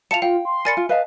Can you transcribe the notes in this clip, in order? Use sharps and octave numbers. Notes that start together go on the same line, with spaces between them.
F4 F5 A5 C#7 F7
F4 F5 G5
C6
A#4 D5 G#5 B5 A6 C#7
F4
B4 D#5 F5 A5